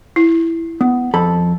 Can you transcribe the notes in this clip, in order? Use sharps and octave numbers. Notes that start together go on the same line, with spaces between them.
E4
B3
F2 A4 B5